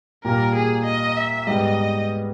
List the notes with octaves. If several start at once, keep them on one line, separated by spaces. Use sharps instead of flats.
A#2 G3 A#3 A#4
G#4
D#5
E5
G#2 G3 B3 D#5